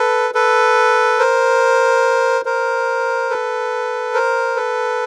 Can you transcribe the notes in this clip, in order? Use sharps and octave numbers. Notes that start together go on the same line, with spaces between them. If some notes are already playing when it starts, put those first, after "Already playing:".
Already playing: A4 B4
A4 B4
A#4 C5
A#4 C5
A4 B4
A#4 C5
A4 B4